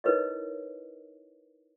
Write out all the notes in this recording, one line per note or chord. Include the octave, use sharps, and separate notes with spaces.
D#4 E4 A#4 B4 C#5 D#5